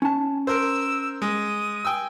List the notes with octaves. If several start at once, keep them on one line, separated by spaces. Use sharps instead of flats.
C#4 A5
A#4 C5 E6
G#3 D#6
G5 G#5 E6